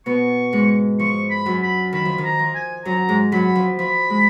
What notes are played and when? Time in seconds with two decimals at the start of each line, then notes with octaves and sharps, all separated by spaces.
0.06 B2 B3 C#6
0.53 G#2 G#3
0.99 F3 C#6
1.30 B5
1.46 F#2 F#3
1.62 B5
1.93 D#3 B5
2.05 F3
2.18 D#3
2.24 A#5
2.39 F3
2.55 G#5
2.85 F#2 F#3 A#5
3.09 G#2 G#3
3.32 F#2 F#3 B5
3.56 F3
3.79 F3 B5
4.10 G#3